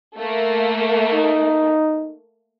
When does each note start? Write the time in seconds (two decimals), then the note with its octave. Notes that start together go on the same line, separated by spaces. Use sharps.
0.16 A3 A#3
1.13 D#4